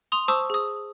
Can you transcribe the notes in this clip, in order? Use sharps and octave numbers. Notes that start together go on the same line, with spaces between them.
C6 D#6 F7
C5 A5 C#6 D#6 E6
G#4 D#6